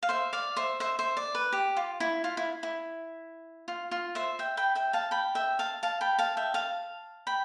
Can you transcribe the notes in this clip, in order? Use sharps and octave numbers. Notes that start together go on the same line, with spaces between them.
F5
C5 E5
D5 F5
C5 E5
C5 E5
C5 E5
D5
B4
G4
F4
E4
F4
E4
E4
F4
F4
C5 E5
E5 G5
G5 B5
E5 G5
F5 A5
G5 B5
E5 G5
F5 A5
F5 A5
G5 B5
F5 A5
E5 G5
F5 A5
G5 B5